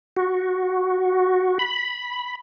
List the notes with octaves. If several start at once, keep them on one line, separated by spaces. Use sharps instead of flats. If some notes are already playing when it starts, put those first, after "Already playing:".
F#4
B5